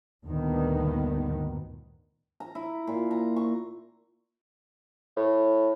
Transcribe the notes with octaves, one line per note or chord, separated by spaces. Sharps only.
D2 G2 A#2 D#3 B3
A#5
E4
A#2
A#5
C#6
A2